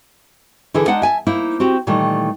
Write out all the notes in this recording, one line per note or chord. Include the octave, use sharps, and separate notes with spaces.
D3 E3 E4 G#4 A4 E5
G#3 D4 D#4 F#5
E5 G#5 A5
A#3 D#4 E4 C5
C4 F#4 G4
A#2 D#3 E3 G3 A3